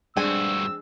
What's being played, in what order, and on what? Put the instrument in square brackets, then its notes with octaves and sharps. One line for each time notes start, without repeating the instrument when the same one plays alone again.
[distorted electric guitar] G2 F#4 [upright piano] G#3 D4 [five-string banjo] C4 G#5 [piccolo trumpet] E6